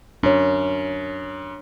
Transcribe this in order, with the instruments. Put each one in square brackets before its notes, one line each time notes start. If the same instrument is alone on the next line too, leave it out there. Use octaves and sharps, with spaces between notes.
[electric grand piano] F#2 [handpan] D4 C#5